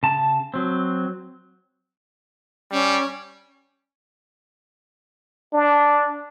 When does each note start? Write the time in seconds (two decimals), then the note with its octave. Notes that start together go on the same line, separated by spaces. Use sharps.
0.03 C#3 A5
0.54 F#3 C4
2.72 G3 C#4
5.53 D4